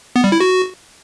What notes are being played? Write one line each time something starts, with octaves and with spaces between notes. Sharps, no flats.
B3
G3
E4
F#4